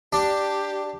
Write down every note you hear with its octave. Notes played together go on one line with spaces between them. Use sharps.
D4 G4